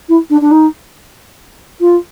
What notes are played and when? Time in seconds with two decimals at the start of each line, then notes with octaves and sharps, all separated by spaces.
0.09 E4
0.30 D4
0.41 D4
0.51 D#4
1.80 F4